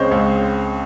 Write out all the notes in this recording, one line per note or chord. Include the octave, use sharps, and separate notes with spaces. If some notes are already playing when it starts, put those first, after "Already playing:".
Already playing: C#2 C#3 G#3 C4 C5 C#5 D#5
C#2